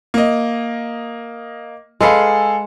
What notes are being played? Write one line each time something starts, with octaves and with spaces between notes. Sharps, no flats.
A#3 D#5
G#3 G#4 A4 B4 F5